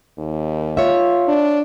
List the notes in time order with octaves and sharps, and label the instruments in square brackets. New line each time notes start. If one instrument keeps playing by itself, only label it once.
[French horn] D#2
[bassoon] F4 [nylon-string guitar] C#5 E5
[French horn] D4